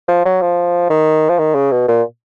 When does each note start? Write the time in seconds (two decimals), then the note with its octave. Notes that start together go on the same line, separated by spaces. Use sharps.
0.08 F3
0.25 F#3
0.42 F3
0.90 D#3
1.30 F3
1.39 D#3
1.55 C#3
1.71 B2
1.88 A#2